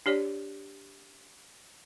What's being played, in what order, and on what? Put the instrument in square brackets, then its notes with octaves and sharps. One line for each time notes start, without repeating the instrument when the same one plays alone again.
[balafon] D4 G4 C#5 D5